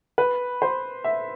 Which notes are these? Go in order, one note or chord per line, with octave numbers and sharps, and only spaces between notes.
B4
C5
E5